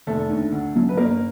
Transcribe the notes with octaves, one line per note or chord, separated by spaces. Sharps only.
F1 A3 A4
D#2 D3
D2
C#3 F#3 A3
B4
G1 A#3 A#4